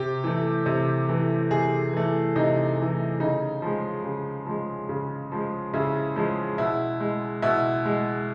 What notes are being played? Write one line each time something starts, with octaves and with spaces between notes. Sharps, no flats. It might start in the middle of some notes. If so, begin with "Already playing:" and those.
Already playing: C3 G4
E3 A3
C3
E3 A3
C3 G#4
E3 A3
C3 D#4
E3 A3
C#3 D#4
F3 G#3
C#3
F3 G#3
C#3
F3 G#3
C#3 E4
F3 G#3
B2 E4
G#3
B2 E4
G#3